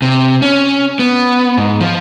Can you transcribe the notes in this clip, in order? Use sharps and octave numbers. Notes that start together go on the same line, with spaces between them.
C3
C#4
B3
G#2
F3